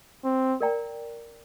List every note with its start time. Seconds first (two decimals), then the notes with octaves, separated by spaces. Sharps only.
0.24 C4
0.61 A#4 D5 G5 A#5